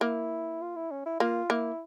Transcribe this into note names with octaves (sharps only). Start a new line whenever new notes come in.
A#3 E4
F4
E4
C#4
E4
A#3 F4
A#3 E4